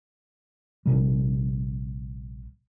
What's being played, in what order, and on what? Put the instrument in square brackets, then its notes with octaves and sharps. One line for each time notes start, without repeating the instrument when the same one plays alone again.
[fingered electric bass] A#1 C3 G3